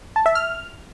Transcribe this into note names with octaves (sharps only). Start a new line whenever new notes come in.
A5
E5
F6